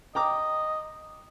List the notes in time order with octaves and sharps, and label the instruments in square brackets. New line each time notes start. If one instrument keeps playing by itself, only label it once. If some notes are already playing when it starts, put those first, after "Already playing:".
[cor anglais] D#5 [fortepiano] G5 A#5 D6